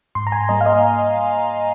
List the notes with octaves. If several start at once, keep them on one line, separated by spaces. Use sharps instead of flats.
G#2 C6
A#5
G#5
G3 A#3 D#5
F5
D#5